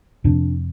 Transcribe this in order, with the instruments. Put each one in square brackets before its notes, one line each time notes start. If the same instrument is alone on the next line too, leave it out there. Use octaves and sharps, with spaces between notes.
[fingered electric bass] F2 C3 D4